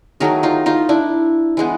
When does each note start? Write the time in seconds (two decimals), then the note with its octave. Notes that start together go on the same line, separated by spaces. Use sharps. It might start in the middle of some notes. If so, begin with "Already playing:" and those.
0.20 D#3 F#3 A3 G#4 A#4
0.43 D#4 F4
0.66 D#4 F4
0.89 D4 E4
1.57 E3 G#3 B3